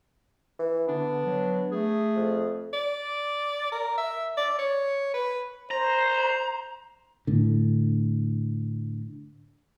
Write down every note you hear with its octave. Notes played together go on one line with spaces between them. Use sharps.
E3
D3 B3 D4
F#3
A3 G#4
F2
D5
A#4
E5
D5
C#5
B4
C5 A#5
A2 D3